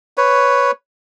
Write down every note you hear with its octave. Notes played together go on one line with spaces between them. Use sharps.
B4 C#5